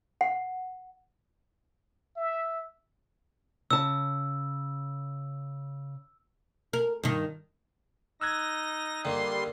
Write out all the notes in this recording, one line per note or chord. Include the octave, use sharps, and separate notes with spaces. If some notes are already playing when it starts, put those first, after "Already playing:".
F#5
E5
C#3 A5 E6
A#4
G2 D#3
D#4 E6 F#6 G#6 A#6
D3 D#3 G3 A#3 C6